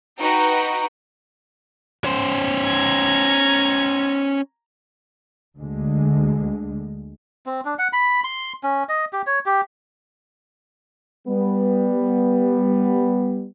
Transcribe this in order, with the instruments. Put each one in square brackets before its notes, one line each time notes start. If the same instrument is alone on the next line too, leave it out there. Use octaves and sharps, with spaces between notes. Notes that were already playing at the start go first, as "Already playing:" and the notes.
[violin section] D#4 F#4 B4 G5 A#5
[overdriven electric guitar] C#4 C5
[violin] A#5 G#6
[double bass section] D2 D3 G#3
[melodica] C4
D4
F#5
B5
C6
C#4
D#5
G4
C#5
G4
[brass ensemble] G3 B3